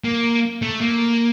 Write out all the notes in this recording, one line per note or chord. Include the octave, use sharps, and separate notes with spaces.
A#3
A3
A#3